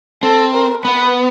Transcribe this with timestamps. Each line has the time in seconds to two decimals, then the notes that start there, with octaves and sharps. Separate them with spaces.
0.23 C4 A4
0.54 A#4
0.85 B3 B4